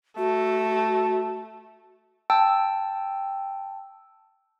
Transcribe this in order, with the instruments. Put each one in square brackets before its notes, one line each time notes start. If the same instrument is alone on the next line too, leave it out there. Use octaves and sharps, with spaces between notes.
[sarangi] A3 [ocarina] F#4
[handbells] G5 A5 E6